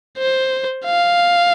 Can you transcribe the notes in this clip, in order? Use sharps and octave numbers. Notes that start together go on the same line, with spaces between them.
C5
F5